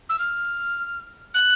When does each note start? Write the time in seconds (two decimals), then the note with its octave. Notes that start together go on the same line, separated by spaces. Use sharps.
0.09 E6
0.19 F6
1.34 F#6